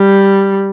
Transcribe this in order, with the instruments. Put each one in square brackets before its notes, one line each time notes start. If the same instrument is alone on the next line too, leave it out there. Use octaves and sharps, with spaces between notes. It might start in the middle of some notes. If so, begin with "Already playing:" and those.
Already playing: [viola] G3